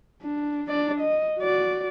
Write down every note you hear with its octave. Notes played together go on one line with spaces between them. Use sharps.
D4
D4 D5
D#5
F#4 D5